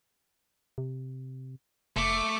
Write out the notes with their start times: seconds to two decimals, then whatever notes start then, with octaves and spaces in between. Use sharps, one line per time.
0.78 C3
1.96 F1 A3 D6